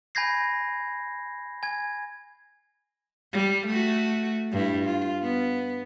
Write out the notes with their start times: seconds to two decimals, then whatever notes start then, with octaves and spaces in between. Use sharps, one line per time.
0.15 G#5 B5 G6 G#6 A#6 C7
1.63 G#5 G#6
3.33 G3
3.67 A3 F#4
4.52 G2 E4
4.85 F4
5.23 B3